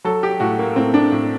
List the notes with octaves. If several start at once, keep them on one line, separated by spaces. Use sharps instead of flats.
F#3 A4
G4
A2 F#4
A#3
A2 C4
D4
A2